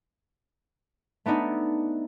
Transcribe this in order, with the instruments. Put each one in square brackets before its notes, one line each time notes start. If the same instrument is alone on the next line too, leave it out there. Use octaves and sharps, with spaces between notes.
[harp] A3 B3 D4 D#4